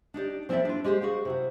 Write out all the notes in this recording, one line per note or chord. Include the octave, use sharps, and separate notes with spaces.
D4 D#4 G4 D5
F3 C4 E4 A4 D5 E5
D4 F4
G#3 G4 G#4 B4 C5
F#4 G#4 C5 F5
C3 E4 F#4